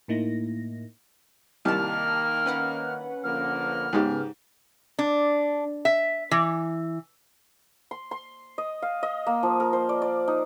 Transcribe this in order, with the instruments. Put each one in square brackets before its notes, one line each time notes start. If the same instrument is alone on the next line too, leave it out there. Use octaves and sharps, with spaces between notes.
[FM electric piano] A2 A#3 D#4 E4 A#6
[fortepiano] C2 [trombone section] D#3 A#3 [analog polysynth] G4 A5 [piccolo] F6
[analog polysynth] C#4 B4 F#5
[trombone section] D3 F3 A#3 [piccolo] F6
[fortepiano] G#2 G4 [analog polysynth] C#3 G#3 B3
[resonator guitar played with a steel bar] D4
E5
E3
[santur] C6
C6
D#5
F5
D#5
A#3
F3
A#4
C5
D5
D5
D#4